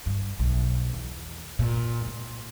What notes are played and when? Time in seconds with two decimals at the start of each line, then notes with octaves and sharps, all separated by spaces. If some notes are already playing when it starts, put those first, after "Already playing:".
0.06 G2
0.39 B1
0.93 E2
1.59 A#2
2.06 A#2